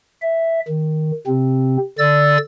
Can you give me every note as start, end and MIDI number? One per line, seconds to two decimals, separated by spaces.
0.22 0.60 76
0.68 1.12 51
1.27 1.77 48
1.27 1.77 60
1.98 2.37 50
1.98 2.37 74
1.98 2.37 88
1.98 2.37 93